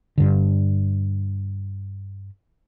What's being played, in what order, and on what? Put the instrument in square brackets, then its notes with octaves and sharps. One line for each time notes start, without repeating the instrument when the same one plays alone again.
[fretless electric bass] G2 D3